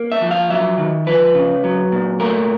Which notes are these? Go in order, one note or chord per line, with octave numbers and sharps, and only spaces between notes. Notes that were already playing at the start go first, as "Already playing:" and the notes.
Already playing: A#3
E5
F3
F5
F#3 E5
D#3
F3 B4
C#3
F#3
A#2
A3 A#4